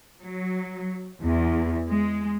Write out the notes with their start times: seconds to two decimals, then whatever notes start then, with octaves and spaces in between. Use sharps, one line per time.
0.21 F#3
1.23 E2
1.89 G#3